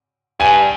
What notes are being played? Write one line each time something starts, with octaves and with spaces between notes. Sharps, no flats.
G2 G#5